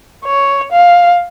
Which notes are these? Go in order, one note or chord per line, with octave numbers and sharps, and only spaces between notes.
C#5
F5